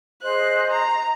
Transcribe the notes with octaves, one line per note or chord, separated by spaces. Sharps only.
G#4 C5 D#5 F#6
A#5